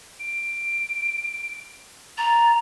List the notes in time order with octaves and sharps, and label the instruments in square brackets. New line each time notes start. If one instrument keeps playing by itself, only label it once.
[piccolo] D7
[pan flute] A#5 [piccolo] A6